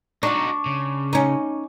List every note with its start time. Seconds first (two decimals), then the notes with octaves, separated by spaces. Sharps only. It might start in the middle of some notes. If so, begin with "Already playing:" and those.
0.23 D4 D#4 F#4 C#6 D6
0.66 C#3
1.13 C#4 D#4